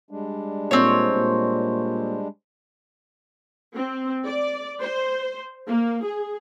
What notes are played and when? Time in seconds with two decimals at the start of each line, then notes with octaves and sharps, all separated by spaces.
0.11 G3 G#3 D4
0.71 A#2 C4 C#5
1.15 A#2
3.76 C4
4.25 D5
4.80 C5
5.67 A#3
6.04 G#4